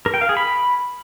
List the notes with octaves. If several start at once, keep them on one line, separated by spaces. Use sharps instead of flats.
A#4
G5
F5
G#4
B5